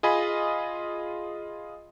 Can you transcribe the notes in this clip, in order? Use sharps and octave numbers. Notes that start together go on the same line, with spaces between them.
F4 G#4 D#5 G#5 B5